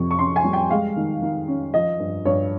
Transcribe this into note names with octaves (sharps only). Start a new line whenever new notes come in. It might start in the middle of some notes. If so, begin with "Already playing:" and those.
Already playing: F2 C3 C#6
C#6
C#4 C6
G#5
G3
G5
G#3 F5
D#3
D#3
C#4
F3 D#5
G2
G2 C#5